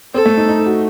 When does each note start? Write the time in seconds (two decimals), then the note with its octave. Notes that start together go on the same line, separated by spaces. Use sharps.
0.14 C4 A4
0.26 A3
0.37 D#4
0.49 D#4
0.66 F#4